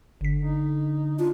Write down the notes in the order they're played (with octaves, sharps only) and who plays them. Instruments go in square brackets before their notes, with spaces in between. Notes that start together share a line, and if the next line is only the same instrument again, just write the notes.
[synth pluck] G1 B6 [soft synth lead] D3
[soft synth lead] D3 [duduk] D#4
[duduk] D4 [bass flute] F4